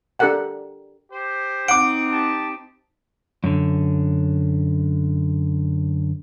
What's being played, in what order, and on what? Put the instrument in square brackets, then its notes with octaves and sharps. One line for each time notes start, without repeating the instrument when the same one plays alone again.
[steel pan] D4 G4 A4 A#4 F#5 G5
[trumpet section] G4 C5
[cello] C4 D#4 [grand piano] F#5 D6 [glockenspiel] D7
[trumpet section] G4 A5
[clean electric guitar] F#2 D3